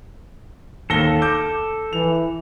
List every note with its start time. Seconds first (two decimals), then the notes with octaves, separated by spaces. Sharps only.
0.90 D#2 A4 A#6 G7
1.22 D6 G6
1.93 E3 F7